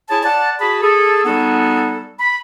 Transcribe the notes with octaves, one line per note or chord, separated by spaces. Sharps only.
E4 G#4 C#5 G#5 A5
D5 F#5 A5
F#4 G#4 A5 B5
G#4 A4
G3 B3 D#4 F#4 G#4 A4
B5